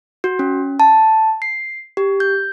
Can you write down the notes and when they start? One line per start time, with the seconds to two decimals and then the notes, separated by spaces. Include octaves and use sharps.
0.24 F#4
0.39 C#4
0.80 A5
1.42 C7
1.97 G4
2.20 G6